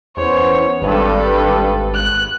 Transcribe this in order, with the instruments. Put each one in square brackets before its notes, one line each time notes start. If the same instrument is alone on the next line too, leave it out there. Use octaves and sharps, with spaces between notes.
[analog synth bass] E2 [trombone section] B3 C#4 C5 [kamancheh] C#5
[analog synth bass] G#1 [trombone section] G2 [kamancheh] A4 B4
[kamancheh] F#6